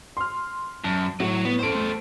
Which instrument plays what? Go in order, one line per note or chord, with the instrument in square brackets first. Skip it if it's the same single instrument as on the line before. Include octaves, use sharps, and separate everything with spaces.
[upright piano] C6 F6
[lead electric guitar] F#2 [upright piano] A5
[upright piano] A2 [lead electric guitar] F#3 F#4
[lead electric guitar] B3
[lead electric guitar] A4 C5 [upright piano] C6 D7
[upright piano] A3